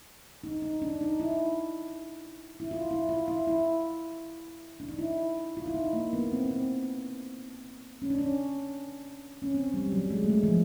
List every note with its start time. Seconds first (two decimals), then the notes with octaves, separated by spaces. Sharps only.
0.44 D#4
0.62 D#4
0.82 D4
1.01 D#4
1.20 E4
2.60 E4
2.71 F4
2.91 E4
3.09 F4
3.28 E4
3.47 E4
4.80 D4
4.89 D#4
4.99 E4
5.57 F4
5.66 E4
5.74 D#4
5.93 A#3
6.13 B3
6.32 C4
6.51 C4
8.02 C#4
8.10 D4
8.19 C#4
9.42 C#4
9.54 C4
9.74 G3
9.92 F#3
10.10 G#3
10.24 A3
10.30 G#3
10.43 F3